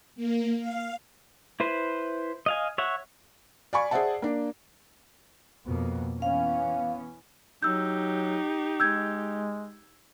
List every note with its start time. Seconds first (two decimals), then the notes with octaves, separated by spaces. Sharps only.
0.16 A#3
0.59 F5
1.60 E4 B4 C5
2.46 D#5 F5 G#5
2.78 C#5 E5 F#5
3.73 D5 F5 G#5 B5 C#6
3.91 G#4 C5 D5 E5 F#5 A5
4.22 A#3 D4
5.66 F2 B2 A#3
6.22 E3 B3 C#4 F5
7.63 F#3 D#4 G4 E6 G6
8.80 G#3 E6 G6 G#6